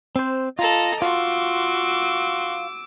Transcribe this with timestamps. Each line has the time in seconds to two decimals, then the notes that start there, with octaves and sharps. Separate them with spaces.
0.16 C4 C5
0.59 F4 A4 D#5 A#5 A#6
1.02 F4 F#4 C6 D6 E6